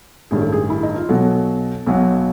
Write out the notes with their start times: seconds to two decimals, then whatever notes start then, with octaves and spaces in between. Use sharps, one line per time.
0.31 A1 G2 D#3 G#4
0.42 A4
0.52 G#4
0.70 E4
0.83 D#4
0.96 F4
1.09 B1 B2 F#3 A4
1.87 B1 B2 F#3